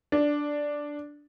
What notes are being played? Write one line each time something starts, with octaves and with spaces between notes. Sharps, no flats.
D4